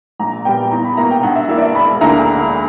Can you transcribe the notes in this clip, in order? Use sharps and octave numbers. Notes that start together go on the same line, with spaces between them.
A#1 A#5
A#2 G3 B3 G5
E2 A#5
B5
B2 A#3 E4 A#5
G5
G2 F#5
E5
E3 A#3 E5
D5
E5
E1 B5
D2 D3 A#3 E4 A#5